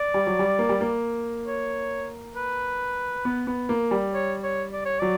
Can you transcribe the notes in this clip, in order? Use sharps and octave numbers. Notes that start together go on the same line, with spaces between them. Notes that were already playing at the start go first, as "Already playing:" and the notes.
Already playing: D5
G3
F#3
G3
A#3
G3
A#3
C#5
B4
B3
B3
A#3
G3
C#5
C#5
D5
C#5
F#3 D5